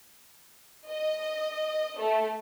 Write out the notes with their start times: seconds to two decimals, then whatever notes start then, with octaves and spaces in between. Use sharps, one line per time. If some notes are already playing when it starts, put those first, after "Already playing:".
0.91 D#5
1.99 A3